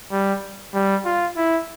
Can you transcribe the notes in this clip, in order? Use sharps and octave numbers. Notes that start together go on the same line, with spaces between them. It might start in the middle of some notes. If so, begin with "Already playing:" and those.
G3
G3
F4
E4